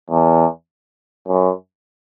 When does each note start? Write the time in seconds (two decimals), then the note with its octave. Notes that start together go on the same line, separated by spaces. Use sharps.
0.10 E2
1.28 F#2